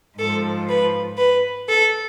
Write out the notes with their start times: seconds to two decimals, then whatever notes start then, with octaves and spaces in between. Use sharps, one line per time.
0.18 G#2 F3 A4
0.68 B4
1.18 B4
1.68 A4